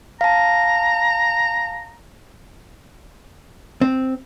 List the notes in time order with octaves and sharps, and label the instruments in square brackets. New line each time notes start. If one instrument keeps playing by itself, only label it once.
[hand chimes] F5 A5 [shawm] A#5
[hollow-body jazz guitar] C4